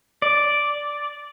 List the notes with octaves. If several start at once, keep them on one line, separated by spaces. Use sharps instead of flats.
D5